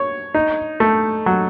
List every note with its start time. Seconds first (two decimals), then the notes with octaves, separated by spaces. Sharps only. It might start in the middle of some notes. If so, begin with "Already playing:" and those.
Already playing: C#5
0.34 D#4
0.80 A3
1.26 F#3